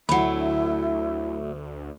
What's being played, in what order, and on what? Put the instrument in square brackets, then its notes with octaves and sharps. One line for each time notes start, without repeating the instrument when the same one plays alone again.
[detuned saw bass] D2 [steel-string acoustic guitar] F#3 A3 [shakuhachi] E4 [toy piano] F#5 B5